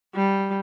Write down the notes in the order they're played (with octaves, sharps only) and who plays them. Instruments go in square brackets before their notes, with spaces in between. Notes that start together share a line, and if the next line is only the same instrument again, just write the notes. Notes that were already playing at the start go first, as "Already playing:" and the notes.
[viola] G3